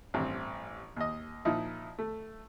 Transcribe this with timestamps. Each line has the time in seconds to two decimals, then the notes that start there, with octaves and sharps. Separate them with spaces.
0.14 A1 G2 C4
0.97 D#2 D#5
1.45 A#2 F3 D#4 E4 D#5
1.99 A3